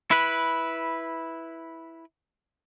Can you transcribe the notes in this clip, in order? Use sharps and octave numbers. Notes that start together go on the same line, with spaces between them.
E4 B4